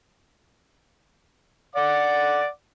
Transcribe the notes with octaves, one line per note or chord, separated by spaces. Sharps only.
D5 F#5 D6